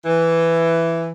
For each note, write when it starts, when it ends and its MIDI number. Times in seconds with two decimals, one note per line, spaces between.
0.05 1.11 52